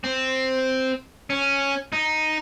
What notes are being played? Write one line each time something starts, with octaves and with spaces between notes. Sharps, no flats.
C4
C#4
D#4